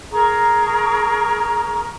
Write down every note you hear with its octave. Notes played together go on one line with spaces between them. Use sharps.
G#4 A#4 A#5 C#6